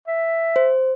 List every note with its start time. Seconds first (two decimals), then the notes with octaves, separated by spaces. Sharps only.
0.07 E5
0.56 C5